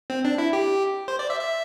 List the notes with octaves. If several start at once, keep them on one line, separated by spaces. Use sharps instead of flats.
C4
D4
E4
G4
C5
D5
E5
E5